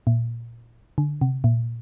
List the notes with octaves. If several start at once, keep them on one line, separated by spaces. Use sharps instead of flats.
A#2
D3
C3
A#2